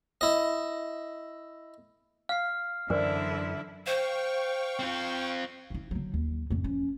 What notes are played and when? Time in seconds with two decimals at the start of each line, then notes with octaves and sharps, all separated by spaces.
0.21 E4 D#5
2.29 F5 F6 C7
2.90 F#2 D3 E3 E4 A#4 C5 D5
3.86 C5 F5 G5 C#6
4.80 C4 F4
5.70 D#4 E4
5.91 D3 F#3
6.14 D#2
6.50 F2 A2
6.64 F3 C#4